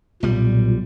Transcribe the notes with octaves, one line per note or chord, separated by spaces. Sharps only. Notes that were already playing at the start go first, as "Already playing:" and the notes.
B1 A#2 G3